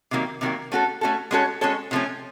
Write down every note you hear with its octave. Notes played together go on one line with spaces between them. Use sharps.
C3 D#3 F#3 A#3
C3 D#3 F#3 A#3
A3 C#4 F#4 A4
A3 C#4 F#4 A4
G#3 C#4 F#4 A4 C#5
G#3 C#4 F#4 A4 C#5
C3 F3 A3 C#4